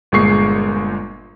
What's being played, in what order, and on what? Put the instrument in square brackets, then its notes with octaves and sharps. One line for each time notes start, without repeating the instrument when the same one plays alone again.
[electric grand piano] G1 A#2 G#3 C#6 C7